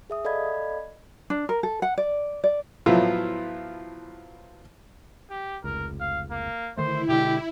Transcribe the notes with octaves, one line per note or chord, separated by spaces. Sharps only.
G#4 E5 D#6
A4 D5 D#5 F5 B5 G#6
D4
A#4
A4
F#5
D5
D5
A2 F3 F#3 B3 E4 F4
G4
F1 C#2 A#4
F5
A#3
D3 D#3 A3 E4 C5
B2 D3 G#3 G4